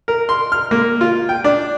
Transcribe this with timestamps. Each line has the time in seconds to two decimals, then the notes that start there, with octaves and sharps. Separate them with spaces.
0.08 A#4
0.29 C6
0.52 F6
0.71 A#3
1.01 F4
1.29 G5
1.44 D4